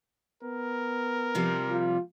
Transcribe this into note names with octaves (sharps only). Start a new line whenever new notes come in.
B3 A#4
C3 F3 G3
F4